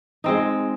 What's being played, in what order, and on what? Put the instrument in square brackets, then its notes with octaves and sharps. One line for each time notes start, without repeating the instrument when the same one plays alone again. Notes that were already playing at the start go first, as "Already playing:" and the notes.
[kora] G#3 C4 D#4